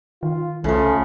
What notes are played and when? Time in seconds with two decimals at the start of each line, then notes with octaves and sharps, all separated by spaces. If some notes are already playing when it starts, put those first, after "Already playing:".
0.23 D#3 F4
0.64 C2 C#3 F3 A3